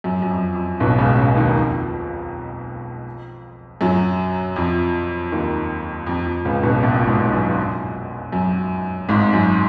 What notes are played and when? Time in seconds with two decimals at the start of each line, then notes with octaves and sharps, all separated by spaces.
0.04 F#2
0.22 F#2
0.31 F2
0.55 F2
0.80 B1 B2
0.98 C#2 C#3
1.17 C#2 C#3
1.37 D#2 D#3
1.55 F2 F3
3.81 F#2 F#3
4.56 F2 F3
5.32 D#2 D#3
6.07 F2 F3
6.25 F2 F3
6.45 C#2 C#3
6.63 B1 B2
6.82 A#1 A#2
7.07 G#1 G#2
7.33 F#2
8.33 F#2
9.09 G#1 G#2
9.33 F#2